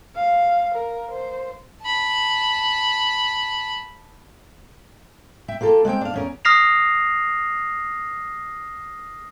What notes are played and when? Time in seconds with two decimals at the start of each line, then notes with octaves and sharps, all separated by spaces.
0.16 F5
0.75 A#4
1.12 C5
1.82 A5 B5
5.48 E5 G5
5.61 A#3 F4 G4 A4
5.85 G#3 A#3 C4 G5
6.01 D4 F5
6.14 E2 C#4 A#4
6.45 D#6 F6 A#6 C7 F7